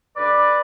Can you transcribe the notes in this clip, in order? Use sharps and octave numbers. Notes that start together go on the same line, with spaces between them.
D2 D3 B4 D5